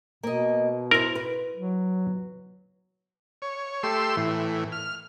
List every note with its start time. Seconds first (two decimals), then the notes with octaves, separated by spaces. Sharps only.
0.23 B2 A#3 D#5
0.91 E4 A#4 C5
1.15 B4
1.54 F#3
3.42 C#5
3.83 A3 G4 C6 E6
4.17 A2 E3
4.72 F6